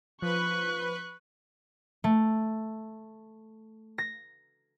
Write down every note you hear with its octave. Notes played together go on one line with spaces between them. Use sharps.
F3 B4 C#6 F#6
A3
A#6